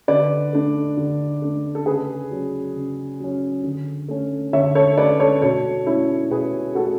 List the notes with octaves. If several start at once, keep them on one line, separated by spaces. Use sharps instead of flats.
D3 B4 D5
A3 D4
D3
A3 D4
A4
C#3 G#4 B4
F#3 C#4
C#3
F#3 C#4
D3
A3 C#4
D3 C#5 E5
A4 C#5
A3 C#4 B4 D5
A4 C#5
B2 A4 C#5
A3 C#4 E4
B2 G#4 B4
A3 C#4 F#4 A4